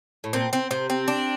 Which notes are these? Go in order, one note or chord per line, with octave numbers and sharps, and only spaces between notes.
A2
A#2 C4
C4
C3 C4
C4
D4